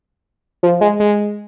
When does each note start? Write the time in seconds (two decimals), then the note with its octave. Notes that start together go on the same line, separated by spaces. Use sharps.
0.63 F3
0.81 G#3
1.00 G#3